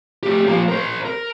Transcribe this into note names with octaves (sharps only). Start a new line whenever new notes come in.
A3 G4
F3 A#3
A#4 C5
A#4